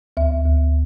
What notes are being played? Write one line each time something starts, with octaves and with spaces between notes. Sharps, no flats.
D2 E5
D2